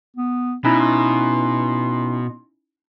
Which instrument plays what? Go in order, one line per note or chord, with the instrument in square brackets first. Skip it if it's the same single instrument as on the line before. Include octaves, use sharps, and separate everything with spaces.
[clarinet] B3
[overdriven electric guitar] B2 [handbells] C#4 D#4 E4 [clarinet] B5
[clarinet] C6